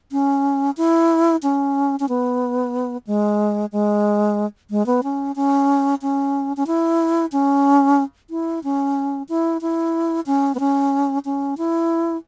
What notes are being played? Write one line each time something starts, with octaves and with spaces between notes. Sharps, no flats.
C#4
E4
C#4
C#4
B3
G#3
G#3
G#3
B3
C#4
C#4
C#4
C#4
E4
C#4
E4
C#4
E4
E4
C#4
B3
C#4
C#4
E4